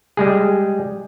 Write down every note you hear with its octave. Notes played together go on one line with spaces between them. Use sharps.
G3 G#3 G#4